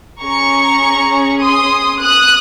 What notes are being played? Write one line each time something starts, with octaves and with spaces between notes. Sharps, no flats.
C#4 G#4 A#5 C#6
C6 D#6
D#6 F#6